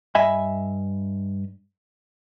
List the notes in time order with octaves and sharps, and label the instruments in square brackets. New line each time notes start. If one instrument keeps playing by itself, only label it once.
[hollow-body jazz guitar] G2 D#5 E5 G#5 B5